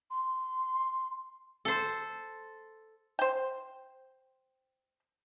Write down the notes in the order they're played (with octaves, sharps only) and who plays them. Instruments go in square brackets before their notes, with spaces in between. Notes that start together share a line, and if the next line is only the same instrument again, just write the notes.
[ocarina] C6
[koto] A4 C5
[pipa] C5 G5